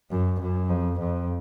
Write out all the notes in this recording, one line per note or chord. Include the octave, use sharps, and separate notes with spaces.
F#2
F#2
F2
F2